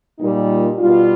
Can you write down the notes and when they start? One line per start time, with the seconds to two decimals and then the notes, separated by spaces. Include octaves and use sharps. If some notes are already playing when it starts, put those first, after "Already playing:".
0.18 A#2 G3 D#4
0.79 B2 G3 F4